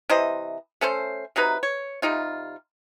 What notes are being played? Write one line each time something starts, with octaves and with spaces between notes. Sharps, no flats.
C3 E3 C5 D#5
A3 C#4 A4 C5
C3 F#3 D#4 B4
C#5
C3 G3 D#4 F4